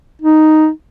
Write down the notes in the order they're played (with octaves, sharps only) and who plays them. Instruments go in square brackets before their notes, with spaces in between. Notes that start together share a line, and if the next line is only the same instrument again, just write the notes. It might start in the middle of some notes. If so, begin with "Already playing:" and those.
[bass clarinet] D#4